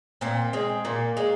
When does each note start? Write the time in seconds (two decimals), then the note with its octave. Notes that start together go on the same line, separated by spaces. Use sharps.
0.21 A#2 C4
0.53 G#3 C4
0.85 A#2 A#3
1.17 G#3